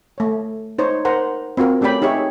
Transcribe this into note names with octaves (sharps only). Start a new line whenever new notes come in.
A3 C#5
D#4 C5 C#5
A#4 C5 F#5 A#5
C4 F4 F#4 A#4
A3 C#4 G4 D5 G5 B5
D#4 G4 G#4 C#5 E5